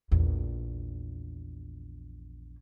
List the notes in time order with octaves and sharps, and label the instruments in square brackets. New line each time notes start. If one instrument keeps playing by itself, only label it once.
[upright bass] A#1 E2